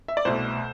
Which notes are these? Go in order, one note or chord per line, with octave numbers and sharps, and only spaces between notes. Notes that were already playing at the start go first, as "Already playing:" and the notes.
E5
D5
C2 B2 A3 C5